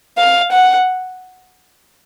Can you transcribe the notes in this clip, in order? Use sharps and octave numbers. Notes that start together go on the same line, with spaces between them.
F5
F#5